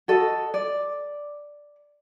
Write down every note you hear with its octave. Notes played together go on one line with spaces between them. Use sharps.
F#4 A4 D#5
D5